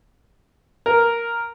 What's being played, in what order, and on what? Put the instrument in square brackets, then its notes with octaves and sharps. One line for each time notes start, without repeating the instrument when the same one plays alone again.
[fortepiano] A#4